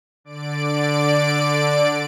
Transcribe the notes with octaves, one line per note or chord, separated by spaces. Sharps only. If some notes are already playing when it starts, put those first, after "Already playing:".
D3 D5 D7